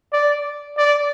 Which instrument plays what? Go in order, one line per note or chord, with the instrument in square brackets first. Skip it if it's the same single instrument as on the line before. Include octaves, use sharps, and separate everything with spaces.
[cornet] D5
D5